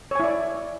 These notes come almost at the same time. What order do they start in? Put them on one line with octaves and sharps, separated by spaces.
C#5 G#5 E4 D5